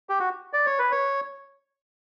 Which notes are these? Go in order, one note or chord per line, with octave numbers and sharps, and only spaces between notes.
G4
F#4
D5
C#5
B4
C#5